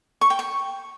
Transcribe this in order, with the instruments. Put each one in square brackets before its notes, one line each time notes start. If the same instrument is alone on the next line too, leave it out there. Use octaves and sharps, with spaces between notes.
[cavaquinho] C#6
G5
C#6